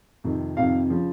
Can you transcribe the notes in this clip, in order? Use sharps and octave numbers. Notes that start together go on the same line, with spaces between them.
F2 C3 D#3
F2 C3 D#3 F5
C#3 F3